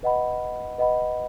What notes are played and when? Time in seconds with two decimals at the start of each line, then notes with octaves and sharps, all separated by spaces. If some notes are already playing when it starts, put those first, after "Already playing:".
0.03 B4 D#5 F#5 B5
0.78 B4 D#5 F#5 B5